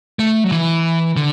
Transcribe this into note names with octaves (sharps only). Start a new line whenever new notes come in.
A3
F#3
E3
D3